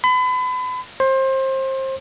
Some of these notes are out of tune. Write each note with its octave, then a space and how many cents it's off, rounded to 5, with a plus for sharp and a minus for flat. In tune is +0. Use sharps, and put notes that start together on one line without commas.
B5 +35
C5 +25